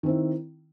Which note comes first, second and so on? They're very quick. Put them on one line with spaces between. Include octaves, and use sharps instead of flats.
D#3 C4 E4